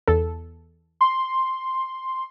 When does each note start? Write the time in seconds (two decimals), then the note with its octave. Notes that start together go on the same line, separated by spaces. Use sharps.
0.08 E2 A4
1.01 C6